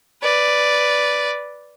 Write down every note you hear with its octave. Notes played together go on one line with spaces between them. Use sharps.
B4 D5